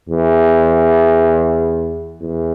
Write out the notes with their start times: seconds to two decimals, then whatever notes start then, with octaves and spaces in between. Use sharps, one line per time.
0.09 E2
2.21 E2